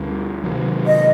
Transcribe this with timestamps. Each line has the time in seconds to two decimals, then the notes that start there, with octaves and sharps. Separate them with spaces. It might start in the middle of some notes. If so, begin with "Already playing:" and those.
Already playing: D2 D3 G3
0.44 C3 D#3 F#3
0.86 D#5